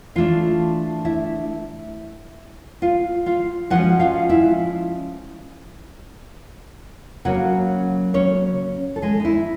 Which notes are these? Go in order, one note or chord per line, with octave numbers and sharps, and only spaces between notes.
E3 A3 D4 F4 F5
E4 E5
F4 F5
F4 F5
F3 G#3 C#4 F#4 F#5
F4 F5
E4 E5
C#3 F#3 A#3 C#4 F#4 F#5
C#4 C#5
A4
G#3 G#4
D#4
E4